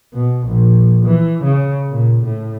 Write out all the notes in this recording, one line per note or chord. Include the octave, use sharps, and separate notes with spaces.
B2
A#1
E3
C#3
A#2
A2